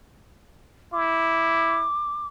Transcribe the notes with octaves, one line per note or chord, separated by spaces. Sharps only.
E4 D6